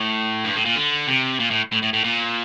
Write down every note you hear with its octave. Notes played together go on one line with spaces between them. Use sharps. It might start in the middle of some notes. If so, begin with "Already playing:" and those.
Already playing: A2
G2
A2
A#2
D3
C3
A#2
A2
A2
A2
A2
A#2